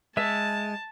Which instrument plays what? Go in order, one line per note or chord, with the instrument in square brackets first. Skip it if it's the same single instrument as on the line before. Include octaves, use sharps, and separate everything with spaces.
[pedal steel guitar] G#3 [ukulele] E5 [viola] A5